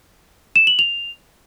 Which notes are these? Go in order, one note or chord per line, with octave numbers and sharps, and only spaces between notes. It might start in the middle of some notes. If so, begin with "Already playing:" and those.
E7
F#7
F7